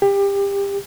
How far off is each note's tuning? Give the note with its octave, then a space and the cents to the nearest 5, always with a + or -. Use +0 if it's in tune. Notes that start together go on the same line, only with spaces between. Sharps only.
G4 +25